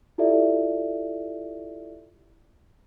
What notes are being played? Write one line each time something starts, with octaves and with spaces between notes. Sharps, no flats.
E4 F4 G4 A4 D5 E5